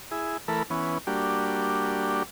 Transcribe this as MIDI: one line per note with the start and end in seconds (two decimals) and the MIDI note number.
0.11 0.37 64
0.11 0.37 68
0.48 0.63 52
0.48 0.63 57
0.48 0.63 69
0.48 0.63 70
0.48 0.63 83
0.70 0.98 52
0.70 0.98 59
0.70 0.98 61
1.07 2.23 55
1.07 2.23 58
1.07 2.23 62
1.07 2.23 66
1.07 2.23 67